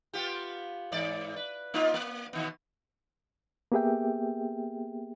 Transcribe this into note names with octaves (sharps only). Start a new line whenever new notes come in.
B3 F4 G4
G#2 E3 D5
B4
A#3 D#4 F4
A#3
B2 D#3 B3
A#3 B3 G4 G#4 E5 G5